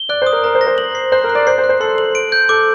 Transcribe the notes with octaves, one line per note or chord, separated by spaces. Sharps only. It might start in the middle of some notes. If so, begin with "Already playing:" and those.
Already playing: G7
D5 F#6
C5 D#6
A#4
A#4 A#5
C5
A#6
C5
F#7
C7
C5 F#6
A#4
F#6
D5
C5 C7
C5
F#6
C5
A4 C6
F#7
D7
G6
A4 D6